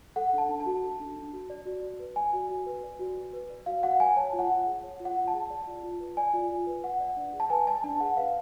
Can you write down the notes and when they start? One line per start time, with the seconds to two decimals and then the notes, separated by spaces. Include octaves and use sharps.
0.16 A4 F#5
0.33 D4
0.38 A5
0.49 D4
0.60 A5
0.66 F#4
0.83 A4
1.00 D4
1.16 D4
1.33 F#4
1.50 D5
1.66 F#4
1.83 F#4
1.99 B4
2.16 D5 G#5
2.33 F#4
2.50 F#4
2.66 B4
2.83 D5
2.99 F#4
3.17 F#4
3.33 B4
3.50 D5
3.66 F#4 F5
3.83 F#4 F#5
4.00 B4 G#5
4.16 C#5 A5
4.33 F4
4.39 F#5
4.50 F4
4.66 G#4
4.83 C#5
5.00 F4
5.05 F#5
5.17 F4
5.28 A5
5.34 G#4
5.50 D5
5.67 F4
5.83 F4
6.00 B4
6.17 D5 G#5
6.33 F4
6.50 F4
6.67 B4
6.84 B4 F#5
7.00 D5
7.17 D4
7.33 G#4
7.40 A5
7.50 B4 G#5
7.67 D5 A5
7.84 D4 A5
8.00 G#4 F#5
8.17 B4 F5